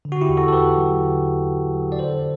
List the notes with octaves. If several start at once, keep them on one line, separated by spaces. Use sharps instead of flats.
D3
F#4
E4 G4
E2
F#4 A4
A4
E2 G4 B4
F#3
D3
E2
E2
F#3
D5
D3 A4 C5